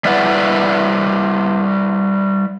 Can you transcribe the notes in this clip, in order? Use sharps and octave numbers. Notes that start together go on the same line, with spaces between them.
G3 E4 B4 D5 F#5